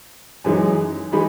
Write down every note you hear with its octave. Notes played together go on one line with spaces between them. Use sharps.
F#2 E3 G#3 D#4
E3 G#3 D#4 B5